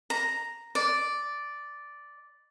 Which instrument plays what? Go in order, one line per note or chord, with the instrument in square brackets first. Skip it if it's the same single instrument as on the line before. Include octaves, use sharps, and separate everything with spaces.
[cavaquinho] A#5
D5